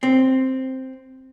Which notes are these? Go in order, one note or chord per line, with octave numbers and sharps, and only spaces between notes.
C4